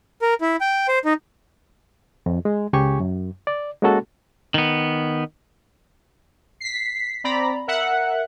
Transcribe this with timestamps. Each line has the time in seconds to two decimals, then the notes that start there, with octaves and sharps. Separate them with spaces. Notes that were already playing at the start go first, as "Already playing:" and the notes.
0.22 A#4
0.41 E4
0.61 G5
0.88 C5
1.05 D#4
2.26 F2
2.45 G#3
2.73 C#2 C#3 G4 G#5 C#6
3.00 F#2
3.47 D5
3.82 G#3 A#3 C#4 F#4 A4
4.54 D#3 B3
6.60 B6 C7
7.24 C4 D5 A#5 B5
7.67 A#4 E5 F#5